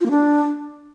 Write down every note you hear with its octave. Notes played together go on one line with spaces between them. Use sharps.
F4
A#3
D4